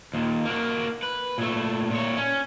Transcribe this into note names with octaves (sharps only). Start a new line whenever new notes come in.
D#2 A#2
A#3 F#4
B4
A#2 A3
A#2 C#5
C#4